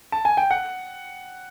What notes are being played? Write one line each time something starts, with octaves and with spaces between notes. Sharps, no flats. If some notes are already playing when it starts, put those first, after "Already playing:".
A5
G#5
G5
F#5